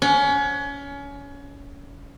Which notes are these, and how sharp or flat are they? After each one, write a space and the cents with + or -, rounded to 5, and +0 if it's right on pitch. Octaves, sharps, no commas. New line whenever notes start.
C#4 +25 F#5 -15